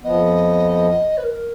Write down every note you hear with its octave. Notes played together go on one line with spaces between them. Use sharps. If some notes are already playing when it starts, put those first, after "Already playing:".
F2 F3 B3 D#5
B4
A#4